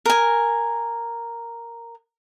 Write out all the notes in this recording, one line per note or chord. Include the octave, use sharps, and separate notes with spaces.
A#4 G#5